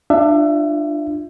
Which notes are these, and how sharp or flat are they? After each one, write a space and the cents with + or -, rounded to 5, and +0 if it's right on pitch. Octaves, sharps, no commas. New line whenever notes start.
D4 +25 F4 +0 E5 +25